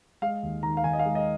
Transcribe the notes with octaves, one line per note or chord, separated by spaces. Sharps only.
G#3 F5
D#2
D#3 A#5
F5
D#3 G#5
D#5
F5
G#3
D#5